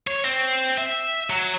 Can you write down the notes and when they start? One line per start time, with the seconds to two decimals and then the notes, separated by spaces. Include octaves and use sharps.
0.07 C#5
0.25 C4
0.78 E5
1.30 F#3